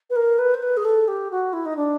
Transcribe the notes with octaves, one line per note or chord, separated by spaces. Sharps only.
B4
A#4
B4
C5
B4
G#4
A4
G4
F#4
E4
D#4
D4